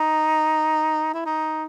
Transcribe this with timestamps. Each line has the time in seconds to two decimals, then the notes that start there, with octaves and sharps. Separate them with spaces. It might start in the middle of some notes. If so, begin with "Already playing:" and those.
Already playing: D#4
1.14 E4
1.26 D#4